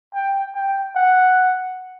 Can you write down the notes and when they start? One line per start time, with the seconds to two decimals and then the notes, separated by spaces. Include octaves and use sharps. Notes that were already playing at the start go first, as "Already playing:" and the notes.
0.14 G5
0.55 G5
0.96 F#5